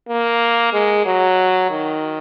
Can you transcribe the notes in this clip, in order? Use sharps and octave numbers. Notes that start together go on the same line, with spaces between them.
A#3
G#3
F#3
D#3